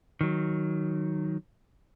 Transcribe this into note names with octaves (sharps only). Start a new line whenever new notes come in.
D#3 F#3